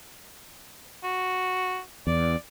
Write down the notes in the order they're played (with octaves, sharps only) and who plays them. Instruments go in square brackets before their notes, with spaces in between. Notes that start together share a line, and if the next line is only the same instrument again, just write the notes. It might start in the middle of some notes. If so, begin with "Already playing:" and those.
[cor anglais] F#4
[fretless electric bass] E2 [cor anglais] D5